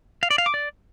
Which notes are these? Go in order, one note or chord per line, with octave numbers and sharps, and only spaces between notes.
F5
D5
F5
D6
D5